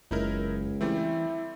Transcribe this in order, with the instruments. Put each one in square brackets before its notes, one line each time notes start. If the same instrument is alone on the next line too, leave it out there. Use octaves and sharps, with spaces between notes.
[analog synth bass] F#1 [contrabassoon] C#2 [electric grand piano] D#4 E4 A#4
[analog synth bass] E3 [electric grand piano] G3 A3 C4 [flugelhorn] E4